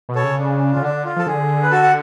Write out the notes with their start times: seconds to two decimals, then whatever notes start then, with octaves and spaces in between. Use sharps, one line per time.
0.09 B2
0.15 A4 C#5
0.24 C#3
0.39 D4
0.73 C#3 F4
0.82 D3 D4
1.04 F4
1.16 F3 A4
1.27 D3 G#4
1.63 B4
1.71 F#4 A4
1.83 F#5